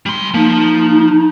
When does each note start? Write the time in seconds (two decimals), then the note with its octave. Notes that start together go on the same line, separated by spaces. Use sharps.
0.06 G3 C6
0.34 F3 A#3 D#4